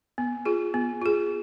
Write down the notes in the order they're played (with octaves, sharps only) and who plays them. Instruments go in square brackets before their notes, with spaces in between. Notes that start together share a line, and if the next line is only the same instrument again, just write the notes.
[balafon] B3
F4 G#4
B3
F4 G#4